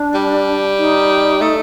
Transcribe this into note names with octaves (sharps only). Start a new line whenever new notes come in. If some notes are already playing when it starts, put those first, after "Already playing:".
Already playing: D4
G3
D#4
A3